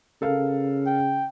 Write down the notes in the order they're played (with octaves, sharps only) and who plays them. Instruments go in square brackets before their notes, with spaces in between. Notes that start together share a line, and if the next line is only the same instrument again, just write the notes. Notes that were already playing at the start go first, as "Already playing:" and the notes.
[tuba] C#3 [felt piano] A4 A#4 F5
[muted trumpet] G5